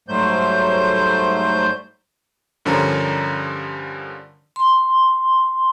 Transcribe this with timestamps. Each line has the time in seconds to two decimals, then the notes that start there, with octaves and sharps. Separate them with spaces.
0.08 G#2 F#3 G3 A3 C5 G6
2.65 G2 D3 F3 C#4 A#4 A#5
4.56 C6